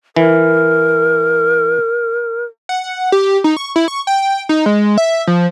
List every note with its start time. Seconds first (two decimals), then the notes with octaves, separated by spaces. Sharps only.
0.16 E3 A#4
2.69 F#5
3.12 G4
3.44 D#4
3.57 C#6
3.76 E4
3.88 C#6
4.07 G5
4.49 D#4
4.66 G#3
4.98 E5
5.27 F3